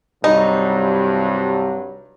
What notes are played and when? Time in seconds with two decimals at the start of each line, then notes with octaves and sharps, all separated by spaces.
0.24 C2 G2 F#3 G3 D#4